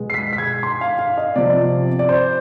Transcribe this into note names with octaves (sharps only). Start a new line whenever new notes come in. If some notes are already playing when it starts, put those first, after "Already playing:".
Already playing: B2 G#3 B3
C7
B6
B6
G#6
C6
F5
F5
D#5
C3 F3 C4 D5
D5
C5